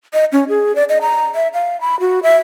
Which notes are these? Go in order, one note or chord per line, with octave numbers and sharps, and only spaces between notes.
D#5
C#4
G#4
D5
D#5
A#5
E5
F5
B5
F#4
E5